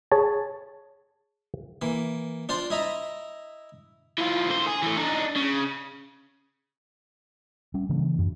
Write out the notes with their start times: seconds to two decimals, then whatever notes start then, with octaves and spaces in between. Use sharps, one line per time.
0.12 G#4 C#5 A5
1.82 E3 A#3
2.49 D4 F4 C5 A5
2.70 E4 D#5 A#5 B5
4.18 E3 F4
4.49 D3 C5
4.67 G#4
4.82 E3 A3
4.97 D4 D#4
5.36 C#3
7.74 G3 C#4
7.89 C#3 E3 A#3 D4
8.19 F#2